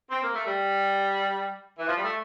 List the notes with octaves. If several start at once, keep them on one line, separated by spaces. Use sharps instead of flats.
C4
A#3
A3
G3
E3
F3
G3
A3